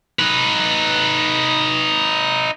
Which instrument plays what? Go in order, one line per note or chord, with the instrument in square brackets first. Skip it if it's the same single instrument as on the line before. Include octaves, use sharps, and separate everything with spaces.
[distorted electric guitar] D#4 B4